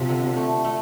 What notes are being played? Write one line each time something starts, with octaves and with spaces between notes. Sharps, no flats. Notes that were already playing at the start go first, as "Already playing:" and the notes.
Already playing: C3 F3
D3
A3
A3